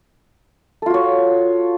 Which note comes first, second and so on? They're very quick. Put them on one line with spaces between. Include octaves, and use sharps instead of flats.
A4 F4 F#4 C#5